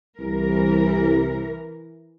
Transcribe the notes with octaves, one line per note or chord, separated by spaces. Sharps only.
C2 E3 A#4